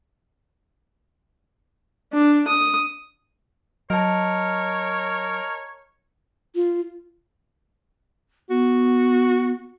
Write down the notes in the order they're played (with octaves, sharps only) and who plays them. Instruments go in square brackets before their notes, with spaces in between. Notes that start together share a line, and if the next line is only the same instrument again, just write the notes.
[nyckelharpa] D4
D#6
[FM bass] F#3 [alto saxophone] A#4 [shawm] C#5 [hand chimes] D#5 A5
[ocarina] F4
[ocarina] B3 [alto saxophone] F#4